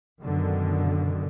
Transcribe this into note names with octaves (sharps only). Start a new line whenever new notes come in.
F#2 B2 D3 D#3